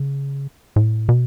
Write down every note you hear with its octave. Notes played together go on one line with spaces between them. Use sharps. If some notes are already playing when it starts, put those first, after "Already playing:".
Already playing: C#3
A2
B2